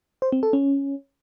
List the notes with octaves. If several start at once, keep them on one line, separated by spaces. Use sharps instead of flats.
C5
C4
A4
C#4